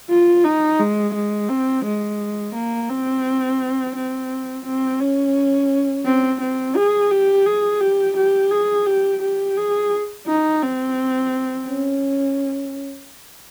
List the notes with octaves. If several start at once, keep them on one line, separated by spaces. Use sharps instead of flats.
F4
D#4
G#3
G#3
C4
G#3
A#3
C4
C4
C4
C#4
C4
C4
G#4
G4
G#4
G4
G4
G#4
G4
G4
G#4
D#4
C4
C#4